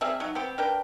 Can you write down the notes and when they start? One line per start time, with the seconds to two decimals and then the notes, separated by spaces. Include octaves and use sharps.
0.01 G3 C4 G#4 E5
0.20 F#3 D#4
0.35 B3 C4 G4
0.58 D4 A#4 B4 G5